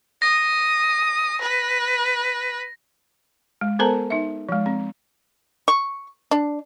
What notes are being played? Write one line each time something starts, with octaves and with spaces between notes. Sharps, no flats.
D#6 A#6
B4
G#3
B3 A4 A#4 C5 A5 A#5
D#4 E5
F3 G#3
C4
C#6
D4